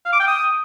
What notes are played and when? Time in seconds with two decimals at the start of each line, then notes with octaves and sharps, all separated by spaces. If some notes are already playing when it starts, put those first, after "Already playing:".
0.05 F5
0.13 D6
0.20 G5
0.27 D#6